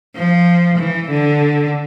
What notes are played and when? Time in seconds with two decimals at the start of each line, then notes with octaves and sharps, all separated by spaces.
0.16 F3
0.79 E3
1.10 D3